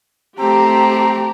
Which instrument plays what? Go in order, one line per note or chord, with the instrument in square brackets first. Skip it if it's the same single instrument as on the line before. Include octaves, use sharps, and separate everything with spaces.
[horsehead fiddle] A3 A#5 [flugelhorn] C4 [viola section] G4